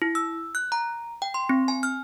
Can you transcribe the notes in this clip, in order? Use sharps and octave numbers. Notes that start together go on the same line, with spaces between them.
E4
E6
F#6
A#5
G5
C6
C4
G#5
F6